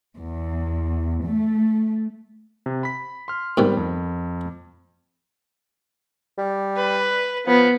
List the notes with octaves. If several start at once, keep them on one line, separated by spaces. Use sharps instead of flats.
E2
A3
C3
B5 B6
C6 F6
G#2 C3 D#3 G3 B3
F2
G3
B4
F3 B3